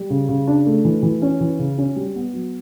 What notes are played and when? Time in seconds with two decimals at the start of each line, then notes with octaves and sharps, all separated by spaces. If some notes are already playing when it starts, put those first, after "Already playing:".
Already playing: G3
0.10 C#3
0.29 C#3
0.47 D4
0.66 A3
0.85 E3
1.03 E3
1.22 C#4
1.40 E3
1.59 C#3
1.78 C#4
1.96 G3
2.16 B3
2.33 F#3